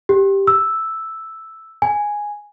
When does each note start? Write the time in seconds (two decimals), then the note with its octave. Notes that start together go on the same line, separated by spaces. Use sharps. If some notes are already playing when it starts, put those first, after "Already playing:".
0.09 G4
0.47 E6
1.82 G#5